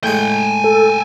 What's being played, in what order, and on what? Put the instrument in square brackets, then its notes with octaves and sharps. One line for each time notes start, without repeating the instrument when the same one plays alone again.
[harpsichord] A2 G#3 [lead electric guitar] G5 G#5
[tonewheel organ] A4